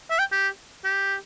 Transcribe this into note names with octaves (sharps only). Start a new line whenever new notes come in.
E5
G5
G4
G4